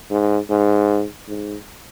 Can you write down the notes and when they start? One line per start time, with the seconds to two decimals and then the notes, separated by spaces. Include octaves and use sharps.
0.10 G#2
0.50 G#2
1.28 G#2